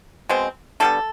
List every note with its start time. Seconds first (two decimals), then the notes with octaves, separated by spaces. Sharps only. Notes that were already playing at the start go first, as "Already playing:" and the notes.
0.29 B2 G#3 C4
0.80 D3 G3 B3 A4